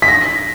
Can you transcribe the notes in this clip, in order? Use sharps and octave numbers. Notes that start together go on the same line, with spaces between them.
B6
A#6